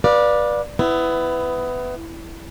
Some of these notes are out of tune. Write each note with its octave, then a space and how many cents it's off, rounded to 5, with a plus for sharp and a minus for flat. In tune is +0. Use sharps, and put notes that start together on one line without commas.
B4 -20 D5 +10 F5 +15
B3 +20 E4 +0